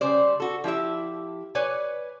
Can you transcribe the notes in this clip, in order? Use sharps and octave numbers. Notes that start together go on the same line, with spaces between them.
C#3 G3 C5 D5
F#4 A4
F3 E4 G4 E5
B4 C#5 D5 G#5